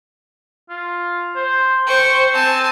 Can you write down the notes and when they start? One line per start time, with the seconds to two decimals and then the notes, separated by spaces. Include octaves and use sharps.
0.70 F4
1.36 C5
1.87 C5 G5 C#6
2.34 C4 G#5 A5